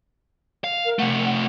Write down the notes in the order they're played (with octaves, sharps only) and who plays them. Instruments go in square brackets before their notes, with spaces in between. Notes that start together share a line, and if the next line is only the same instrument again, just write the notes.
[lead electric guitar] F5
[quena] A#4
[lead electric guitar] C3 A3 [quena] F#5